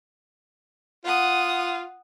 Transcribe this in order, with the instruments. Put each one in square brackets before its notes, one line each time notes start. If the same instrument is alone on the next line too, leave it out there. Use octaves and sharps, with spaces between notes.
[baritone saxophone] F4 [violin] F#5 D#6